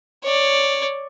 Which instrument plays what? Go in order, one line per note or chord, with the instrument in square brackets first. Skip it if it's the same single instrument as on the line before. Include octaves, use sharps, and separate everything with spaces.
[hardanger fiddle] C#5 D5